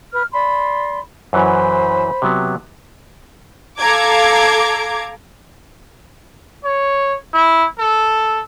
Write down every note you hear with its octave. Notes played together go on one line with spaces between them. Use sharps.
B4 F6
D5 B5 C6
F#2 E3 F#3 C5 B5
C3 F#3 B3
A4 F5 A#5 D6 G#6
C#5
E4
A4